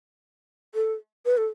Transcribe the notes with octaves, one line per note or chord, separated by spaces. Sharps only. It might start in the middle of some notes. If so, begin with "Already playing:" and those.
A4
B4
A4